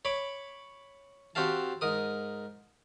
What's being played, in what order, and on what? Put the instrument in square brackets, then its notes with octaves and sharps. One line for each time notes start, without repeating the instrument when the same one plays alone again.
[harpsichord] C#5 B5 D6
C4 F#4 G4 F5 A5
G#2 A#4 D#6